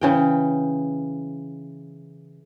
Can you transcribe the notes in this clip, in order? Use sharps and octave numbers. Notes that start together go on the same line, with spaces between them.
C#3 E3 G5